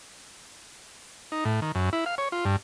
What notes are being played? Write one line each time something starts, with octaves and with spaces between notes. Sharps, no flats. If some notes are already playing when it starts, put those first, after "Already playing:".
D#4
A2
D#3
F#2
E4
F5
C#5
F4
G2